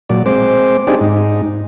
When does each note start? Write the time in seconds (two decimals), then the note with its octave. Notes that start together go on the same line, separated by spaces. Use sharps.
0.09 A#2 F#3 D5
0.26 G#3 C4 C5 D6
0.87 C4 D4 D#4 G4 G#4 D5
1.01 G#2 D#4